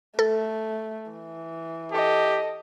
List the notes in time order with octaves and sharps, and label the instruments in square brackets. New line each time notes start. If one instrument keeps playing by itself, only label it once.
[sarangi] A3 [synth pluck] A4
[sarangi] E3
[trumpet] G4 [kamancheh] A4 D#5